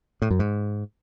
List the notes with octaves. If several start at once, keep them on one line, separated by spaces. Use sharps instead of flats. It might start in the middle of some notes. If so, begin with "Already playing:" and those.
A2
F#2
G#2